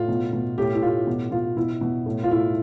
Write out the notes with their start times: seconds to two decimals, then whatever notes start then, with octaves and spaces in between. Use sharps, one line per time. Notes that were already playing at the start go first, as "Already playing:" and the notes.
Already playing: A2 F4
0.08 B2
0.33 B2
0.58 A2 G4
0.75 E4
0.82 A2 F4
1.07 B2
1.31 B2 F4
1.57 B2 E4
1.81 B2
2.06 A2
2.23 F4
2.31 A2 E4